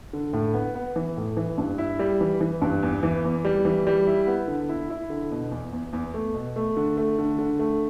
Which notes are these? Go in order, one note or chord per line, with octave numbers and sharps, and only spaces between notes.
D3
A2
B3
B3
E3
A2
E3
G2
E4
G3
E3
E3
G2
E2
E3
E2
G3
E3
G3
E4
B3
D3
E4
E4
D3
B2
E2
E2
E2
A3
B2
A3
D3
A3
D3
D3
A3